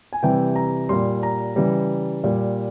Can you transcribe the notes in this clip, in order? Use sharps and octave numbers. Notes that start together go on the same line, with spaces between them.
G#5
C3 E3 G3 G5
A#5
A#2 G3 C6
A#5
C#3 E3 G3
A#2 G3